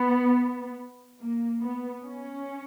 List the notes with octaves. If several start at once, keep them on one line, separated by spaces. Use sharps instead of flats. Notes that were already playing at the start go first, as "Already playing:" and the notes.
Already playing: B3
A#3
B3
C#4